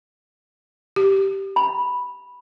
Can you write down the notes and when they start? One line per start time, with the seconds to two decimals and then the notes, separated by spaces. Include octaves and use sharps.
0.96 G4
1.56 B5